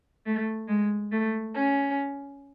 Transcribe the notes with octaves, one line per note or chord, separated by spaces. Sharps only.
A3
G#3
A3
C#4